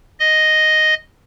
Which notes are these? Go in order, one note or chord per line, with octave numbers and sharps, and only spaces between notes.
D#5